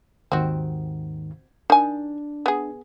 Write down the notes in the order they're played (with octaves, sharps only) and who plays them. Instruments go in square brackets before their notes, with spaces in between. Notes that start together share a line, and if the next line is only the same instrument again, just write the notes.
[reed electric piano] D#2 G#2 D#3 [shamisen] C4 F#4
[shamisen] D#3 G#5 [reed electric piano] D4
[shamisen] B3 G#4